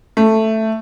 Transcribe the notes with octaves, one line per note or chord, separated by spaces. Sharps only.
A3